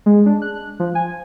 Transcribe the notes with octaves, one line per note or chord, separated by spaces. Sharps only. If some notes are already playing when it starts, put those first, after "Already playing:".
G#3
D4
F#6
F3
G#5